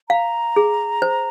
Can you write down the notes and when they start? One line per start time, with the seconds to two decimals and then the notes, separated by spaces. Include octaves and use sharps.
0.09 F5 A#5
0.56 G#4
1.02 C5